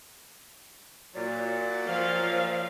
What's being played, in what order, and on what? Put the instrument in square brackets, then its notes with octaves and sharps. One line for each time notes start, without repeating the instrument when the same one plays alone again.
[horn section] A#2 F#3 [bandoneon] D5
[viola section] F3 F5